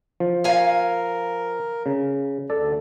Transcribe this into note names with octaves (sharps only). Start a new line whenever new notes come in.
F3
A#4 F5 G#5
C#3
D2 A4 D5